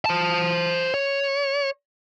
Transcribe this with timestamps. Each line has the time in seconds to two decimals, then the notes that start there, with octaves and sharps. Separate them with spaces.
0.06 C5 A5
0.94 C#5